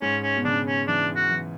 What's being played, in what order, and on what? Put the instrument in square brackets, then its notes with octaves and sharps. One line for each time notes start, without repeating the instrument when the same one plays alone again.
[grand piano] G#2 [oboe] C#4
[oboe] C#4
[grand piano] B2
[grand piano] C#3 [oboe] D4
[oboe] C#4
[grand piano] E3 [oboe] D4
[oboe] F#4
[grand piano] E3